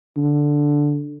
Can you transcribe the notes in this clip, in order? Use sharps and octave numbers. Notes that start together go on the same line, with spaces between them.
D3